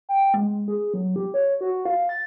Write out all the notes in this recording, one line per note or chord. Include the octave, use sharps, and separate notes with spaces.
G5
G#3
G#4
F#3
G4
C#5
F#4
F5
A6